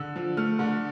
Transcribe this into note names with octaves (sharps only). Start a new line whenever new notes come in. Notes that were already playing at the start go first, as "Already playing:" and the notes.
Already playing: D3 E6
F3
A3 F6
D3